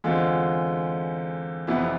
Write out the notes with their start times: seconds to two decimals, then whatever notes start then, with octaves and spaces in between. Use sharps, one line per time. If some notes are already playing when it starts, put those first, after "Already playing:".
0.04 E2 D3 G#3 C4 F4
1.67 F1 F2 E3 B3 E4